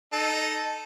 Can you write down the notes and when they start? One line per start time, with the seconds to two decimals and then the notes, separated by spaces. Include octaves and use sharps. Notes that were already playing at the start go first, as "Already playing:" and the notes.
0.13 D#4 A4